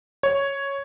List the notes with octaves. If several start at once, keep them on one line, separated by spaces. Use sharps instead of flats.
C#5